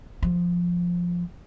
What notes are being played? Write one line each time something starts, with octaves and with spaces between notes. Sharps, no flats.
F3